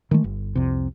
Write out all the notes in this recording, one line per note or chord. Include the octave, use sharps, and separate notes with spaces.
D#3 E3 G#3 A3
G1
C2 F2 C3